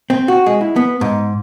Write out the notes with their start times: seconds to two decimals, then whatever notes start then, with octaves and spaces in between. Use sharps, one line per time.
0.10 C4
0.28 F#4
0.46 G#3
0.61 E4
0.76 B3
1.01 G#2